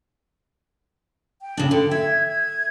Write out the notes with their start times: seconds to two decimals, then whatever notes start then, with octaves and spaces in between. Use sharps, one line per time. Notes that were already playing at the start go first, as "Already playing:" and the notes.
1.42 G5
1.57 C#3 D4
1.71 D3 G5
1.91 E5 G#6
2.27 G#6